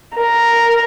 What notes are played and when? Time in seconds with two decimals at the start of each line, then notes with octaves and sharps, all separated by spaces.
0.16 A#4